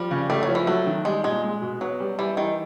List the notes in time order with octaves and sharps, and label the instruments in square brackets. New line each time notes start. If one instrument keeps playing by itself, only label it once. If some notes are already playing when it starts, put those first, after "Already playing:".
Already playing: [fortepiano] F3 [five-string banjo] G3
[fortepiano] C#3
[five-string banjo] G3 [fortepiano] A3
[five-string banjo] F#3
[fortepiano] F3
[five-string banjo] E3
[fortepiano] F#3 [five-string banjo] A3
[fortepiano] D#3
[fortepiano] G3 [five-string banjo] G#3
[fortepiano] A#2 [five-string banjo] G#3
[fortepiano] G#3
B2
[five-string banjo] F#3 [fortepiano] B3
[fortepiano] G3
[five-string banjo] E3 [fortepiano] G3
[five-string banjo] D#3 [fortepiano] E3